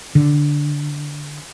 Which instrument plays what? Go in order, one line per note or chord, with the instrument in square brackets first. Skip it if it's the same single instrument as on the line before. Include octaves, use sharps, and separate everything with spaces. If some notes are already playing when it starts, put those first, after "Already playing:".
[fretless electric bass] D3